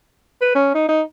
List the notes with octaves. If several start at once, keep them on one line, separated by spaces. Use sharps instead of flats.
B4
C#4
D#4
D#4